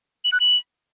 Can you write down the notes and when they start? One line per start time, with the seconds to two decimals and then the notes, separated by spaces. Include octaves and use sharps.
0.24 F#7
0.32 F#6
0.40 F#7